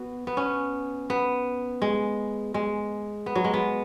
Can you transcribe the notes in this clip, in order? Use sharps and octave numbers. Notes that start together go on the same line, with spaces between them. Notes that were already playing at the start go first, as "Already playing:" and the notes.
Already playing: B3 F#4
B3
C#4
B3
G#3
G#3
B3
F#3
G#3
B3